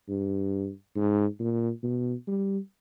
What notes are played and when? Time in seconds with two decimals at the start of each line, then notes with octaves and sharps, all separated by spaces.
0.09 G2
0.95 G#2
1.39 A#2
1.83 B2
2.28 G3